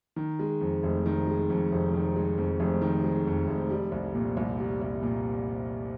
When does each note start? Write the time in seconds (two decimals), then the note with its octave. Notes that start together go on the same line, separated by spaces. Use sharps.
0.16 D#3
0.39 G#3
0.61 F2
0.83 F1
1.06 D#3
1.27 G#3
1.50 F2
1.72 F1
1.94 D#3
2.16 G#3
2.38 F2
2.60 F1
2.82 D#3
3.04 G#3
3.27 F2
3.48 F1
3.70 G3
3.92 C2
4.14 A#2
4.37 C2
4.59 G3
4.81 C2
5.02 A#2